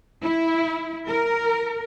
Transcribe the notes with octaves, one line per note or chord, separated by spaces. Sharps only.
E4
A#4